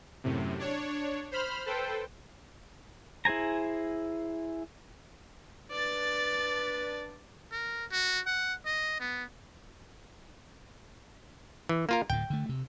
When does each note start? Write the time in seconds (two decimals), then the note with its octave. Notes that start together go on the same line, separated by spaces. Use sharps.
0.24 F#2 A2 C3
0.59 D4 C#5
1.32 C5 B5 F6
1.66 A4 B4 C5 G5
3.25 E4 G#4 C5 G#5 A#5
5.71 D4 B4 D5 A6
7.52 A#4
7.92 F#4
8.26 F#5
8.66 D#5
9.00 B3
11.69 E3
11.89 A#3 F4 A#4
12.10 D1 A2 G5
12.30 D3 A3
12.49 C3